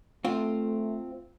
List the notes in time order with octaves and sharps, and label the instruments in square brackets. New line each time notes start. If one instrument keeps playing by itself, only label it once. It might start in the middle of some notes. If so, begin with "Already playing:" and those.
[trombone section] A3 [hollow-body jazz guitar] C4 F4